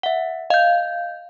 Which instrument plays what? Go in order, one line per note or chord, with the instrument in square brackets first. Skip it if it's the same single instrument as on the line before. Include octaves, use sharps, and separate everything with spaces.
[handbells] E5 F#5
[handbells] D#5 G6 [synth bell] F5